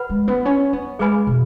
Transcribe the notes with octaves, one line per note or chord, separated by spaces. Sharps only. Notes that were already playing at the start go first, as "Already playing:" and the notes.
Already playing: B4 F#5 B5
G#3
B3
C#4
B3
G#3 G#4 B4 G#5 B5
B2